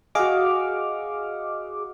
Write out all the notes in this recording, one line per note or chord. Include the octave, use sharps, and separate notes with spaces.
F#4 G#4 D#5 F5 D6